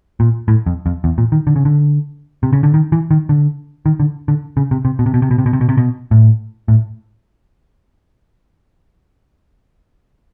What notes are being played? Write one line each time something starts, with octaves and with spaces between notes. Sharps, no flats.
A#2
A2
F2
F2
E2
A#2
D#3
D3
C#3
D3
C3
C#3
D3
D#3
E3
D#3
D3
D#3
D3
D3
C#3
C3
C3
B2
C3
B2
C3
B2
C3
B2
C3
B2
C3
B2
A2
A2